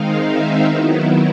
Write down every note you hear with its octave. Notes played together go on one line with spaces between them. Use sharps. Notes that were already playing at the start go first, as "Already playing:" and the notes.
Already playing: D#3 G#3 C4 D#4 F5
E5
D#3 F#3 B3 E4